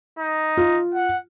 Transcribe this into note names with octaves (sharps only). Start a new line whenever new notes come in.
D#4
F4
F#5